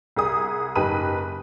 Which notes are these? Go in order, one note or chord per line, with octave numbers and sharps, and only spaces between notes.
C2 G#4 D#6
F#1 G#2 G4 B4 B5 D#7